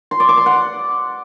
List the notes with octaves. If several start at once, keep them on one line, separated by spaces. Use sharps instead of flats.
C6
D5
D6
C6
F#5